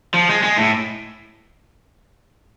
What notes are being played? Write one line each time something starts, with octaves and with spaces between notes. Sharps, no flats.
F3
G#3
G#3
A2